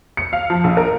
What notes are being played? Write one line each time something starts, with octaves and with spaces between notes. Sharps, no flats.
C#7
F5
F3
A#1
A#4